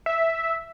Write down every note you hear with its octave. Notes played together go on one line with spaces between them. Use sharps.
E5